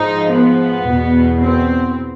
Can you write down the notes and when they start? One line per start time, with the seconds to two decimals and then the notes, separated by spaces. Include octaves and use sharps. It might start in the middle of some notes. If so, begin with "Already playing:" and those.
Already playing: G#2 F3 D#4
0.33 B3
0.88 E2 B2
1.44 C4